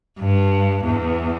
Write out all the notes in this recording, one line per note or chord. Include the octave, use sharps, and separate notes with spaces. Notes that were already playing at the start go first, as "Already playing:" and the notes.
G2
E2